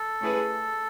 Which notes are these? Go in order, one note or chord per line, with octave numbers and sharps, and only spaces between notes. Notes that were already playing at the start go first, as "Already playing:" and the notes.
Already playing: A4
A3 C#4 E4 G#4 B4